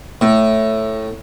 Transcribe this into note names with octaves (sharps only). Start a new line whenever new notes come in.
A2